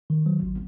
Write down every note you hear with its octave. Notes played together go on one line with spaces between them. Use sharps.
D#3
F#3
G#1